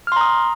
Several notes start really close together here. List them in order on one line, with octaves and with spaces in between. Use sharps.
F6 C6 A#5 D#6